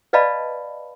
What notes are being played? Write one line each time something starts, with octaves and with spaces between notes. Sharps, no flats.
B4 D5 D#5 F5 A5 B5